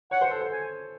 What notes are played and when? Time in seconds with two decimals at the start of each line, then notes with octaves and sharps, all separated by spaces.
0.11 C#5 F#5
0.21 C5
0.31 A4
0.41 C5
0.52 G#5